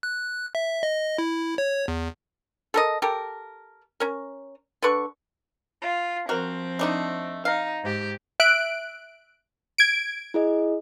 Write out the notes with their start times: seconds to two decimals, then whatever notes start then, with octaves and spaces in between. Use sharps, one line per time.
0.03 F#6
0.55 E5
0.83 D#5
1.18 E4
1.58 C#5
1.88 E2
2.74 A4 A#4 D#5
3.02 G4 A4 A#4
4.00 C#4 A#4
4.82 D3 A4 B4 C#6
5.83 F4
6.29 F3 C4 F#4 A#4
6.79 A3 D4 D#4
7.45 D#4 F5
7.83 G#2 G4
8.40 E5 F#6 D7
9.78 G#6 D7
10.34 E4 G#4 D#5